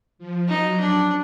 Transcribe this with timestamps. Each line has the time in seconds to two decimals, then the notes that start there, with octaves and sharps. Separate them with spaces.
0.18 F3
0.49 F#3 D#4
0.80 D4